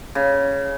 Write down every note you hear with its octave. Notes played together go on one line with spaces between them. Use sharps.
C#3